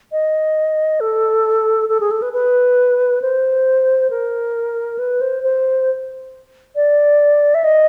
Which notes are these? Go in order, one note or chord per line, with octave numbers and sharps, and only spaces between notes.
D#5
A4
A4
G#4
A4
B4
B4
C5
A#4
B4
C5
C5
D5
E5
D#5